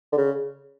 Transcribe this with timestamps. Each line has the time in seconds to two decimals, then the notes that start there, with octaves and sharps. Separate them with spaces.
0.12 D3
0.17 C#3